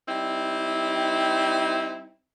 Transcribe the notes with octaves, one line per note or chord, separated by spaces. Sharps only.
G3 C4 D#4 E4